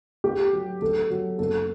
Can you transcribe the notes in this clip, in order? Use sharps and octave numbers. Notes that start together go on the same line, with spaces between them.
A3 G4
F#3
A3 A4
F#3
F#1 A4